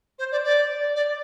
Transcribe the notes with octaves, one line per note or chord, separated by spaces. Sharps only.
C5
D5
D5
D5